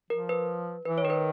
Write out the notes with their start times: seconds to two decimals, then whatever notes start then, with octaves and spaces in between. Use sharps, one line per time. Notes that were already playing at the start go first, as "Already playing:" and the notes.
0.10 F3 A#4
0.29 B4
0.85 E3 B4
0.98 C#5
1.04 D#3 A#4
1.10 B4